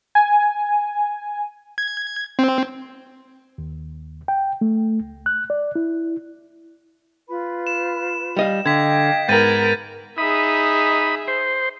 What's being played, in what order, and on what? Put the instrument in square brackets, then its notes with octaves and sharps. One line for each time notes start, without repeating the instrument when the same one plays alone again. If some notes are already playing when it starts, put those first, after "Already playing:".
[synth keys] G#5
[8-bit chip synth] G#6
C4
[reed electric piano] D#2
G5
A3
C#2
F#6
D5
E4
[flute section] F4 B4 B5
[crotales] E7
[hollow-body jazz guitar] G3 D#5 F5
[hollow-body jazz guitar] D3 [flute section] D#5 F5 G5 [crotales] G#6 B6
[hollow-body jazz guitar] G#2 [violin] B3 A#4 [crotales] G6 A6 D#7
[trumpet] D#4 [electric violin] G#4 E5 [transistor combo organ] B5 D#6
[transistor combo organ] C5